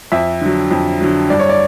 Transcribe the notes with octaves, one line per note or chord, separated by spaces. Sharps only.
F2 E5
D3 F#3
F2
D3 F#3
G2 D5
C#5
D5